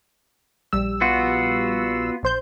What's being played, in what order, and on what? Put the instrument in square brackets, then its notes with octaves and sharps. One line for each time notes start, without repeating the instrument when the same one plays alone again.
[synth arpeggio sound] A#1 G3 E6
[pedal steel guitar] B3 F4 F#4
[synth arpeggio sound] A#1 C5 G6